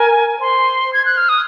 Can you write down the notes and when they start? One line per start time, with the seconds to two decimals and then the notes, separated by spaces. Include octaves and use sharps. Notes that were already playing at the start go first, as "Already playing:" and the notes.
Already playing: A#4 G#5
0.41 C5 C6
0.93 G#6
1.05 F#6
1.17 F6
1.29 D#6